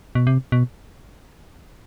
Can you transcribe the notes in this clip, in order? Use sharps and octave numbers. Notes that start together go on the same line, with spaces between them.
B2
C3
B2